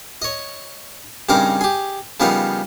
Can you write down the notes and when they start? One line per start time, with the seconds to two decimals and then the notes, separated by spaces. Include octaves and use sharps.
0.22 C#5 D#5
1.29 G2 C#3 C4 D#4 A#4 D6
1.61 G4 G#4
2.20 C#3 F3 G3 B3 D#4 A#4